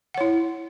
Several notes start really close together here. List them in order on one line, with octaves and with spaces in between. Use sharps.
F#5 C#5 E4